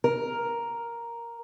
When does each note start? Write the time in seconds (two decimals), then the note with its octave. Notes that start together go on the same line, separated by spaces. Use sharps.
0.04 A#4